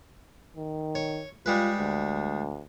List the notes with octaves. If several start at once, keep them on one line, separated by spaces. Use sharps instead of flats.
D#3
C#5
G3 G#3 F4 B4
D2